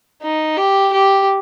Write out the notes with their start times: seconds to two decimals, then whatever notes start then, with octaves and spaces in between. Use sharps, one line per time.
0.22 D#4
0.57 G4
0.93 G4